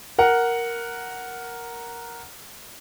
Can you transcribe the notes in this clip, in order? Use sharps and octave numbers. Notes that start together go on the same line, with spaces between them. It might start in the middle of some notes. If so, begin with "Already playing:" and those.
A#4 F#5